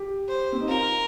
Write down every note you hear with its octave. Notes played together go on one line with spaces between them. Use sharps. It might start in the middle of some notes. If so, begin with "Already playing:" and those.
Already playing: G4
C5
C4
D#4
F4 A#4